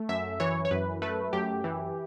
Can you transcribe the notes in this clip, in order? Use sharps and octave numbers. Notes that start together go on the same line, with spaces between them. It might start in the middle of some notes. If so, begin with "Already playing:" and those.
Already playing: A3
F#2 E5
E3 C#5
C#5
F#2 B4
A3 B4
F#2 G4
E3